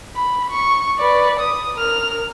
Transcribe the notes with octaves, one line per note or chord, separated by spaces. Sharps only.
B5
C#6
B4 D5
D#6
A#4 F6